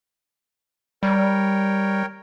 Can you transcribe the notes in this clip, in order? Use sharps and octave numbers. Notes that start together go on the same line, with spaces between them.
G3 A#4 C#5 G5